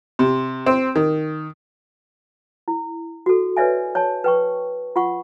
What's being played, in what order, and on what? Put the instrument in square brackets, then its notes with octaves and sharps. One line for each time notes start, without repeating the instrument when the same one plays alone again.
[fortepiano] C3
C4
D#3
[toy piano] E4
F#4 A4
B4 C#5 D5 E5 G#5
C#5 A5
B4 G5 C#6
F4 F#5 C#6